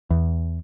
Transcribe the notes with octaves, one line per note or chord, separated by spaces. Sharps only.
E2